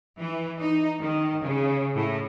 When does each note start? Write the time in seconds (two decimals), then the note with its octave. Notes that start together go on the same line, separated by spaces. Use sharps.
0.19 E3
0.60 D#4
1.00 D#3
1.43 C#3
1.95 A2